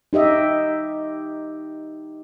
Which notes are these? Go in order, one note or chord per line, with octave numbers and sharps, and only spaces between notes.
D#4 G4 D#5 E5